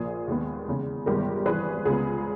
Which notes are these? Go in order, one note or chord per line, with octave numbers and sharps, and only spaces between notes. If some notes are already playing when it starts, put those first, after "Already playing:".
Already playing: A#1 A#2 A#3 G#4
D#2 D#3 G#3 B3
E2 C#3 G#3
G1 G2 D#3 G#3 B3 G4 A#4
G#1 G2 E3 G#4 B4
C#2 C#3 G#3 B3 G#4